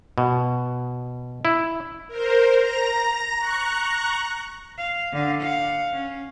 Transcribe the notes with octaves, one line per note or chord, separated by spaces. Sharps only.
B2
E4
A#4 C5
A#5 A#6
A#5 C#6 F#6
F5
D3 F5
F5 F#5
C#4